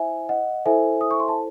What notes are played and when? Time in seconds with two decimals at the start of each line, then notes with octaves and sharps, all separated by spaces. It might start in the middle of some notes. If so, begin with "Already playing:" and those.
Already playing: E4 C5 E5 G#5
0.29 D#5 F#5
0.66 E4 A4 C5 E5 G#5
1.01 D#6
1.11 C#6
1.20 C6
1.28 A5